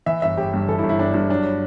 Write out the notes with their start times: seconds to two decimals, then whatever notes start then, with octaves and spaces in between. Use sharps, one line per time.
0.06 E3 E5
0.22 G1 E5
0.37 G1 G4
0.53 G2
0.68 E3 A4
0.79 E4
0.83 G1
0.89 E4
0.99 G1 D4
1.14 G2 E4
1.29 F#3 D4